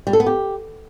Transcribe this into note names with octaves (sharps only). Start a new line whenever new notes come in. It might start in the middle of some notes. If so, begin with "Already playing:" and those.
G3
A4
B3
G4